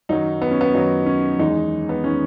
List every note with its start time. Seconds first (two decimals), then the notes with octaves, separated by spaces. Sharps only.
0.09 F#2 D#3 F#3 D#4
0.42 B3
0.51 C#4
0.61 B3
0.74 F#2 D#3 F#3 D#4
1.06 C#4
1.39 E2 D#3 G#3 D#4
1.89 B3
2.04 D#3 G#3 C#4